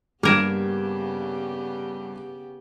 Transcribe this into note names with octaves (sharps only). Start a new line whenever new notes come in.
G2 C#3 A#3 B3 G4 A#4 G#6 E7